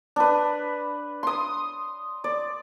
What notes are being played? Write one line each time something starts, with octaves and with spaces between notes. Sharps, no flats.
D4 B4
C6 D#6
D5